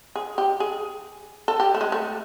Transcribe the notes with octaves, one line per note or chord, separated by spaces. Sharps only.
G#4
G4
G#4
A4
G4
A3
G#3
A3